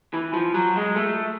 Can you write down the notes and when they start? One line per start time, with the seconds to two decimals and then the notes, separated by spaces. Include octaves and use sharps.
0.13 E3
0.34 F3
0.54 F#3
0.76 G#3
0.96 A3